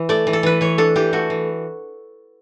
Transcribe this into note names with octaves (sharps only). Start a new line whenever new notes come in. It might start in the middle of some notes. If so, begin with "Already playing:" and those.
Already playing: E3
A3 D5
E3
A4
E3 B4
E3 C#5
D4 A4
E3 G4
A3 F#4
E3